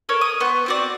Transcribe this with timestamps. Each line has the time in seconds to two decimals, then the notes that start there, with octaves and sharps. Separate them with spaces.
0.09 A4 A#4 C#5
0.21 D#6
0.40 B3 C5 C#6
0.66 C4 F#4 D5